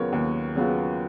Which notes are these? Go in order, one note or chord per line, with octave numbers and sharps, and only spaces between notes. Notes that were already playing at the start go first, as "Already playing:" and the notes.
Already playing: D#2 C#3 F#3 B3 F4 A#4 C#5
D#2
C#3 F#3 B3 F4